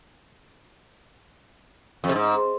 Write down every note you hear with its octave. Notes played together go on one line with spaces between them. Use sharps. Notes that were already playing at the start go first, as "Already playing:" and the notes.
F2
C3
G#2